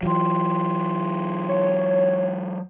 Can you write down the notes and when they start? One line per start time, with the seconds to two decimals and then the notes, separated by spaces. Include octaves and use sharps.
0.03 E3 F#3 F4 G5 C6
1.49 C#5